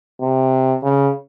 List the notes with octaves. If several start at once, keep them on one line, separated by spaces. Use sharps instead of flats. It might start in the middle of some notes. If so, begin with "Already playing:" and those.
C3
C#3